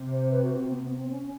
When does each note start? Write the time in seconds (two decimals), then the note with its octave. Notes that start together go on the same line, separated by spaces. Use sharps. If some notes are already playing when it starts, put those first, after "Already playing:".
Already playing: C3
0.11 C5
0.31 B4
0.44 F#4
0.57 C4
0.70 B3
0.83 B3
0.96 C4
1.10 C#4